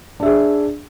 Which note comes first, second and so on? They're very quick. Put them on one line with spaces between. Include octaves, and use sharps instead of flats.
D4 E5 G#4